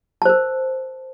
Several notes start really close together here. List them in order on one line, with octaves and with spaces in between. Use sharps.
A5 C5 A#4